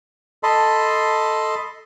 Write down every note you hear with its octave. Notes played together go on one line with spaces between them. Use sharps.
A4 D#5 A5 B5 C6